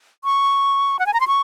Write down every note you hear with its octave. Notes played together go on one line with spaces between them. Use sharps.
C#6
F#5
G#5
A#5
C6
C#6